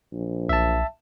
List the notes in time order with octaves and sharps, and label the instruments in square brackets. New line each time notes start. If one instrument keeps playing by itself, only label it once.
[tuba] A#1
[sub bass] B1 [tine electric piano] E5 A5